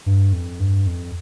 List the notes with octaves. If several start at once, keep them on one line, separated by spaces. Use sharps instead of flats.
G2
F2
G2
F2